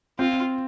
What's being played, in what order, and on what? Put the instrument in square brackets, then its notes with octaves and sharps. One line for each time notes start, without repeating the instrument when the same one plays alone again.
[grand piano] C4 [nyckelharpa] F4